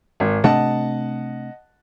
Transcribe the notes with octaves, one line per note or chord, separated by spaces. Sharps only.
G#1
C3 A3 D4 D#5 F#5 A5